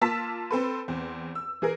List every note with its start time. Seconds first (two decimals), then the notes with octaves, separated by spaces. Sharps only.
0.01 A#3 F4 A5 E6 B6
0.51 C4 A4 B4
0.88 E2 C4
1.35 E6
1.62 E3 G#4 A#4